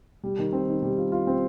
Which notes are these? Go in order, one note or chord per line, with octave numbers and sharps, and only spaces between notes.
G3
D#3
C4
D#3
G3
F4
F4
C4